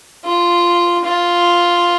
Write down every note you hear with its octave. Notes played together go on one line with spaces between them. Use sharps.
F4
F4